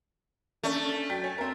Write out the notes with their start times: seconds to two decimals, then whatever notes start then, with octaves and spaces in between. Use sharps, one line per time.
0.63 A3 A#3 C#4 D4
1.10 F#3 G5 B6
1.24 C#5 G#5
1.38 C4 A#4